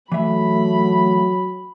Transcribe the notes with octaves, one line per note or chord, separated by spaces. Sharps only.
E3 F#3 A3 E5 B5